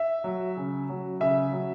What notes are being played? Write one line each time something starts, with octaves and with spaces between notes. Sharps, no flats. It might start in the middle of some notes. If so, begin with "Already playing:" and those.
Already playing: E5
F#3
C#3
F#3
C#3 E5
F#3